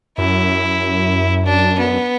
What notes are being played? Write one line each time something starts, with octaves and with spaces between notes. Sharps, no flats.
F#2 E4
D4
B3